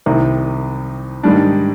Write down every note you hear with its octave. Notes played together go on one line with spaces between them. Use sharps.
C2 C3 D#3
G#2 D#3 G3 D4